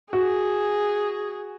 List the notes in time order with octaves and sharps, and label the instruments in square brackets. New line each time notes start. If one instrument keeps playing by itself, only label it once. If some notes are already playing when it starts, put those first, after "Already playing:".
[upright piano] F#4 [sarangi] G#4